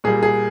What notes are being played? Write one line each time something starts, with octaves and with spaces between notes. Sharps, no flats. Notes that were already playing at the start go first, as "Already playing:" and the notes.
A#2 G3 G#4
G#4